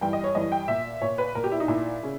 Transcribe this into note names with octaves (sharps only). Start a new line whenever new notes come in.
G2 E3 G5
D#5
C#5
G2 E3 D#5
G5
A#2 E5
A#2 C#5
B4
A#2 A#4
G4
E4
D#4
A#2 E4
C#3